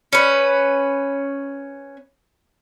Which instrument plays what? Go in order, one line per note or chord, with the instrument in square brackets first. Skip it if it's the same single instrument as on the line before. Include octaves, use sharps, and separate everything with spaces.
[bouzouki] C#4 B4